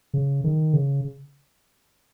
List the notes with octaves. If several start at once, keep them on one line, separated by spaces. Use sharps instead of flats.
C#3
D#3
C#3